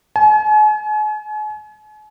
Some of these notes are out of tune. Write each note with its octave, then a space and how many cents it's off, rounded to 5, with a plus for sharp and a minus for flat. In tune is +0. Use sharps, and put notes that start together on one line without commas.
G#5 +40